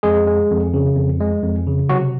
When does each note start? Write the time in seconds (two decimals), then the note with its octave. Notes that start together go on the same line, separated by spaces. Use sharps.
0.03 F2 G#3 G#4
0.27 G#3
0.51 F2
0.74 C#3
0.96 F2
1.20 G#3
1.43 F2
1.67 C#3
1.89 C3 F#3 F#4